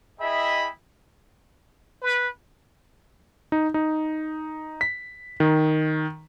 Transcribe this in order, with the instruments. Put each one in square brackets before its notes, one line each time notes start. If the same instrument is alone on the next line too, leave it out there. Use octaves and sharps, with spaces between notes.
[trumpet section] E4 G#4 D#5 E5 G5 B5
[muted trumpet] B4
[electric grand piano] D#4
D#4
B6
D#3